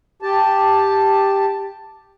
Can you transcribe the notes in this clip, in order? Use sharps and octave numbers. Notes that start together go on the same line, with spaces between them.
G4 A5